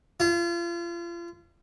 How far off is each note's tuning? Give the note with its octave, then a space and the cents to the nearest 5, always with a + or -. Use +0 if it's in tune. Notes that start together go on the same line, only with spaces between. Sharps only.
F4 -35